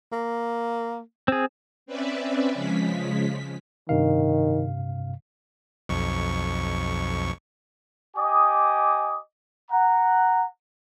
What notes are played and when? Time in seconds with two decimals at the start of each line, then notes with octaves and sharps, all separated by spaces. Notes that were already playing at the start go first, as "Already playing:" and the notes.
0.12 A#3
1.28 C4 G#4
1.86 C4 C#4 B4 D5 E5
2.54 C#3 F3 G#3 B6
3.89 G2 C3 D#3 F5
5.89 B1 F2 C#6
8.16 G4 D#5 G#5 D6 D#6
9.71 F#5 A#5